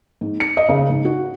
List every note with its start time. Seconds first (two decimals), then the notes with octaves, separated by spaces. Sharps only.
0.21 G#2
0.40 C#7
0.57 D#5
0.69 C#3
0.90 G#2
1.05 F#4